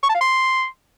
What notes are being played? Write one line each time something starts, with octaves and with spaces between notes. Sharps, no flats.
C#6
A5
F5
C6